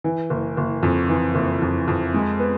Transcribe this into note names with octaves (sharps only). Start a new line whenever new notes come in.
E3
F#1
F#1
F2
E3
F#1
F2
F2
G#3
B3